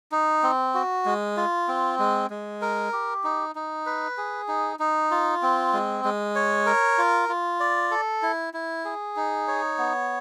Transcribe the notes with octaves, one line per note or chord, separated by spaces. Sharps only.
D#4
C4
F#4
G#3
F4
C4
G#3
G#3
A#4
G4
D#4
D#4
B4
G#4
D#4
D#4
F4
C4
G#3
G#3
C#5
A#4
F4
F4
D5
A4
E4
E4
G#4
D#4
C#5
B3